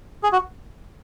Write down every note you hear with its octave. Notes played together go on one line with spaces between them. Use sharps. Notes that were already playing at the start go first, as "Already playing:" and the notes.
G#4
F#4